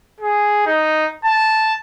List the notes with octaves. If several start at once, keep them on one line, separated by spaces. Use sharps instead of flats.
G#4
D#4
A5